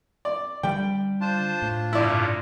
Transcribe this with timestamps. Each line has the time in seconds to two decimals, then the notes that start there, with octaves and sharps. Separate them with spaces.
0.25 D5
0.63 D3 G3 G5
1.21 D4 F4 C5 A5
1.62 A2
1.93 G2 A#2 C#3 E4 D5